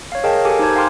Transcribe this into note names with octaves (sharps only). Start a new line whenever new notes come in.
C#5 F5
G#4 A#4 D#5 F5 G5 A5
G4 A4 A#4 G#5 D6
D#4 C5 A5 G#6
F5 G5 G#5 C6 D6 F6